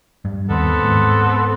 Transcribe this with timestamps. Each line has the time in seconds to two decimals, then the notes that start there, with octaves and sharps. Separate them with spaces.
0.25 G2
0.49 D#2 B3 C4 A4
0.84 G#2